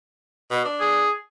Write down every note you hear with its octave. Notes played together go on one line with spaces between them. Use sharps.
B2
D4
G#4